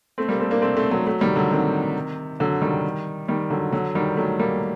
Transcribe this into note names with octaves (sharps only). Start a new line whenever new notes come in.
A3 C4
G3 A#3
A3 C4
A#3 D4
A3 C4
A3 C4
F#3 A3
F#3 A3
D#3 G3
D3 F#3
C3 D#3
D3 F#3
D#3 G3
D#3 G3
D3 F#3
D3 F#3
D#3 G3
F#3 A3
G3 A#3